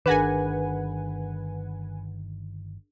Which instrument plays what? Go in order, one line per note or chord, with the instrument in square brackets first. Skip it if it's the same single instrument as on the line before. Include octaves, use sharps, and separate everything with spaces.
[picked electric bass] G1 D#3 [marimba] D4 G#4 A#4 [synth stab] B4 F#5 G#5